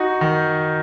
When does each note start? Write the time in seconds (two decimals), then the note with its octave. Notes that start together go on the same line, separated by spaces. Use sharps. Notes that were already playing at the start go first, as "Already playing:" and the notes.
Already playing: D#4 F#4
0.21 D#3